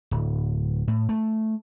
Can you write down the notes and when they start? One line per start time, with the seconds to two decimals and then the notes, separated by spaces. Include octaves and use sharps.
0.11 D1
0.87 A2
1.09 A3